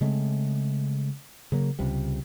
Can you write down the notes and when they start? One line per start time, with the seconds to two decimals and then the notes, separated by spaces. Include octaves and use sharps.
0.01 C#3 G#3 A3 C4
1.52 C#3 F#3 A#3
1.79 C#2 C3 G3